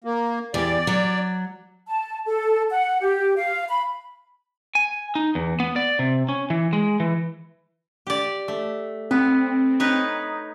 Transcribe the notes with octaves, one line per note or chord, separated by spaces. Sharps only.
A#3
E2 G4 D5
F#3
A5
A4
F#5
G4
F5
B5
G#5
D#4
E2
B3
D5
C3
C#4
E3
G#3
E3
G4 D5
A3
B3 C4
D#4 B4 C#5